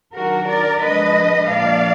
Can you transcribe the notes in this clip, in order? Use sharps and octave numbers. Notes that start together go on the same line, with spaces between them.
D#3 F#3 D4 F#4 A#4
A#4 D5
D3 F3 G#3 D4 B4 D#5
A#2 F3 A#3 D4 D5 F5